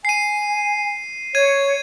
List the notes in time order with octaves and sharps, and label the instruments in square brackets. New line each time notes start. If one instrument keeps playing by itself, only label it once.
[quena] G#5 [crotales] C7 D#7
[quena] C#5 [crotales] G#6 D#7